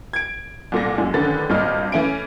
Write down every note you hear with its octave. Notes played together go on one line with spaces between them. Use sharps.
G#6 D7
C2 A#2 A4 A#6
F#2 G#3
A1 D3 D#3 C#4 B4 A6
G#1 G2 A#2 D#5 F6
E3 A3 C#4 E4 D7